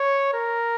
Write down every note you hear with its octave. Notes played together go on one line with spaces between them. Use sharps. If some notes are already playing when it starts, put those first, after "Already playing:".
Already playing: C#5
A#4